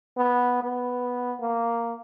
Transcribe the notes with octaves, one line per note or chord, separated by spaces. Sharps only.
B3
B3
A#3